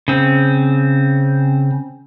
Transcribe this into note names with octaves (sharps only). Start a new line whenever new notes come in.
C#3 C4